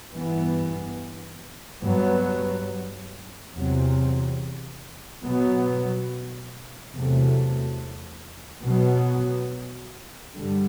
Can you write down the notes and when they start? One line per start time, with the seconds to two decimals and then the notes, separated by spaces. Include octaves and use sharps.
0.13 G2 E3 B3
1.83 G2 F#3 B3
3.53 E2 C3 F#3 C4
5.23 B2 F#3 B3
6.92 E2 C3 F#3 A3
8.63 B2 F#3 B3
10.33 G2 D3 G3